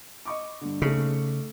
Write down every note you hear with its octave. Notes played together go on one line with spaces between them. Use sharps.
D#5 C#6 D6
G2 D3
C#3 A3 D#4